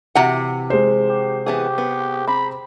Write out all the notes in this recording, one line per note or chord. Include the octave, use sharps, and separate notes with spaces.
C3 E3 F#4 F#5 A#5
G#3 C5
G4
E3 B3 G4 G#4
B3
C4 B5